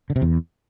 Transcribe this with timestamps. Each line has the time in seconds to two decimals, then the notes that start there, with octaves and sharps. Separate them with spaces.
0.10 D3
0.16 C3
0.22 E2